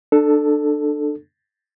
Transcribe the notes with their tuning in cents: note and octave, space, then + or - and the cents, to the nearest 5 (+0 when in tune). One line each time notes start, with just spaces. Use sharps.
D4 +25 A4 +0